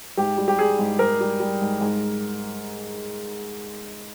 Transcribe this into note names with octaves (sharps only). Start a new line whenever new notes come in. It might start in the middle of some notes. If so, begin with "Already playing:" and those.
G#2 G4
G3
G4
G3 G#4
G#2
G#2 A#4
G3
G3
G#2
G#2